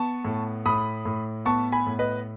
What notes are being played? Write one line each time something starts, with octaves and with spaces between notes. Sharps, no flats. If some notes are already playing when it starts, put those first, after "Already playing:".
Already playing: B3 A5 C#6
A2
A2 B5 D#6
A2
B3 A5 C#6
G#5 B5
A2
B4 D#5